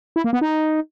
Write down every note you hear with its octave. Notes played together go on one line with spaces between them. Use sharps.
E4
A#3
B3
D#4